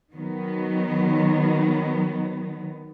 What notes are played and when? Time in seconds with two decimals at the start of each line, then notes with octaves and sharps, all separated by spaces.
0.14 D#3 F#3 B3